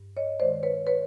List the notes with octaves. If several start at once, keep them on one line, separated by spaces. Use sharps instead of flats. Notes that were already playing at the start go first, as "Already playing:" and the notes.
Already playing: G2
C#5 D#5
D#3 G#3 C5 D5
B4 C#5
B4 C#5